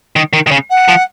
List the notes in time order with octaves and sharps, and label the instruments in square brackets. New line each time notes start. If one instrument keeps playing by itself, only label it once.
[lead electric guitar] D#3
D#3
D#3
C#3
[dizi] F#5
[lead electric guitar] F3